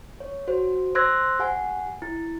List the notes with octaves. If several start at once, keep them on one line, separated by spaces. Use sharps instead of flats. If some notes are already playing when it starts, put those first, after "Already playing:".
C#5
F#4 C5
C5 C6 E6 F#6 G#6 A#6
G4 F#5 G#5
E4